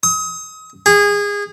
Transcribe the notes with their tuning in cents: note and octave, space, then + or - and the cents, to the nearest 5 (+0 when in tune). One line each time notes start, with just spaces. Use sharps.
D#6 +35
G#4 -25